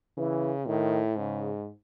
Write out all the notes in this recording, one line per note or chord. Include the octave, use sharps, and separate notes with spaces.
C#3 E3
A2 D#3
G#2 C#3